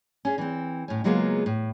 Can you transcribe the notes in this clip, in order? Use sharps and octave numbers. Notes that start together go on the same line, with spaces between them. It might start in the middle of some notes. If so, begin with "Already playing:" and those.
C#4 G#4
E3 C4
A2 C#4
C#3 F#3 G#3 A#3 B3 F4
A2